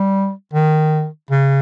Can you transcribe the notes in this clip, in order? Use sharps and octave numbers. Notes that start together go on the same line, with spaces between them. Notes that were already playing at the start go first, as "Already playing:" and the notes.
Already playing: G3
D#3
C#3